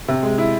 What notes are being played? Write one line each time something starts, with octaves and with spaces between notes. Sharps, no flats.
C3
G#3
E4